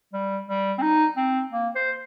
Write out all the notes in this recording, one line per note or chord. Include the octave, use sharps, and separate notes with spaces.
G3
G3
C4
D#4
C4
A#3
C5